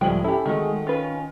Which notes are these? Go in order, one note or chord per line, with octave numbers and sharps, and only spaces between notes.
C#2 A2 F3 G3 G#3 E4 G5 F#7
C#4 E4 G4 A4 B5
D#3 G#3 A3 F#4
C#4 F4 B4